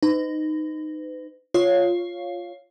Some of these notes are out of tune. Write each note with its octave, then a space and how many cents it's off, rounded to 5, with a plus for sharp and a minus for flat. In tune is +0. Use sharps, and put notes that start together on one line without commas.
D#4 -10 B4 +40
F4 +5 C#5 +0 F5 +0